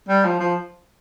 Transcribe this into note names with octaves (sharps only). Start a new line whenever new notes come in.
G3
F3
F3